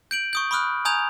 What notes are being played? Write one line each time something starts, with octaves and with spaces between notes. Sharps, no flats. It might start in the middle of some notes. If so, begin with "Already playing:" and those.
G6 D7 F#7
C#6 D#6 G6
B5 C#6 D#6 F6 F#6
G#5 A#5 D#6 G6 G#6 F7